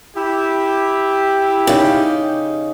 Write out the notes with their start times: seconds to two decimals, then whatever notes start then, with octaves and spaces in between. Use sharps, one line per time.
0.15 E4 G4
1.67 C#3 D#4